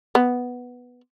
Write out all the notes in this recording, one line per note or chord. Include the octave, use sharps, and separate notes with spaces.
B3